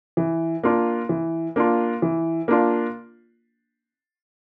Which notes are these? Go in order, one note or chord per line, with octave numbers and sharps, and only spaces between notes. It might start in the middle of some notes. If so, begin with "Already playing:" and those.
E3
A#3 D4 F4
E3
A#3 D4 F4
E3
A#3 D4 F4